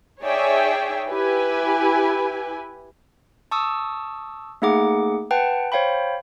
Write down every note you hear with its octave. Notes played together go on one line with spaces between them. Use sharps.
D#4 G#4 C#5 D5 E5 G5
E4 G4 B4 G#5
A5 C#6 D#6 E6
A3 A#3 D#4 G#4 F#5 D6
B4 F#5 G5 A5
C5 C#5 F5 G5 B5